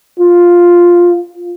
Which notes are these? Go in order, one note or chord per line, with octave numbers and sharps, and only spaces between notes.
F4